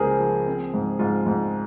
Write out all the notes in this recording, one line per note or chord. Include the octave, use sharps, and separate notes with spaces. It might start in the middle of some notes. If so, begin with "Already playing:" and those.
Already playing: C#2 C#3 A#3 G#4 A#4 C5
F3
C4
G#2
G#2 F4
G#2